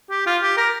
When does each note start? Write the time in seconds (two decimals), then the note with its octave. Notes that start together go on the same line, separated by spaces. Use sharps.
0.11 G4
0.27 F4
0.42 G4
0.58 A#4